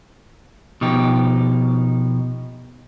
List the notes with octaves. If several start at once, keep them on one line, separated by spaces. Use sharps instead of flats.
B2 F3 D#4 G4